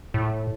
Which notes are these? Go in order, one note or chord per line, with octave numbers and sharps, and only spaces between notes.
A2